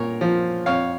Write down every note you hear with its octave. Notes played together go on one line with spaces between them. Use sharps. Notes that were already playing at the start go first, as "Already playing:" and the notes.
Already playing: A#2 A#4 C#5
F3
F2 C#5 F5